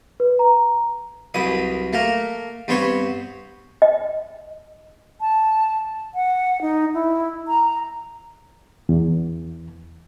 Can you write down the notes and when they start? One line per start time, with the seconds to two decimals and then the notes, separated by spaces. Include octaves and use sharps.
0.20 B4
0.39 A#5
1.34 C2 F#2 B4 D#6
1.93 A3 A#3 A#4
2.68 G2 B3 C4 C5 C#5 F#5
3.82 D#5
5.21 A5
6.14 F#5
6.62 D#4
6.94 E4
7.48 A#5
8.89 E2